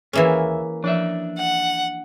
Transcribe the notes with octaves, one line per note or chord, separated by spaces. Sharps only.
D#2 E3 A#3 C#4 G#4 B4 E5
F3 D4 D5 E5
F#5